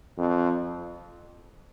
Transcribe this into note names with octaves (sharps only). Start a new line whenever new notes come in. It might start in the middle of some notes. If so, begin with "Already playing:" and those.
F2